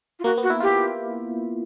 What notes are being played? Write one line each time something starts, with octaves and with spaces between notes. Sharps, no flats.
F4
A#3 F#4
B3
F#4
E4
F4 G4